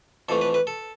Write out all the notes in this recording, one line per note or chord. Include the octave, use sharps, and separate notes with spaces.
F2 E3 A3 A4
B4
B4
A4